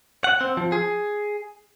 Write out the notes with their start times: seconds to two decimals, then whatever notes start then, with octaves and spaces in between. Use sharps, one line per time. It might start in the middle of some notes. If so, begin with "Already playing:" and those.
0.24 F#5
0.41 C4
0.57 F3
0.72 G#4